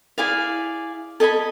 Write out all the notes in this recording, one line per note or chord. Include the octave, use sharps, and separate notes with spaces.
E4 G#4 D5 F5
A4 D#5 G#5 B5